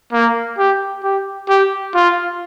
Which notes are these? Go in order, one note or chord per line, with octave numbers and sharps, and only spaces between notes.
A#3
G4
G4
G4
F4